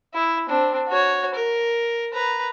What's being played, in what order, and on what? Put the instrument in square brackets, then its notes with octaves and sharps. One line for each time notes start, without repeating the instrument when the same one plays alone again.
[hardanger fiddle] E4
C4 D4
F#4 C#5
A#4
B4 A#5